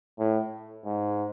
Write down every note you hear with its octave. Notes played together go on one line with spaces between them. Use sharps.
A2
G#2